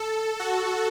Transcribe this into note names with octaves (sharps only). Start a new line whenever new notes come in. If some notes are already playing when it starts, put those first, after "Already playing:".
Already playing: A4
F#4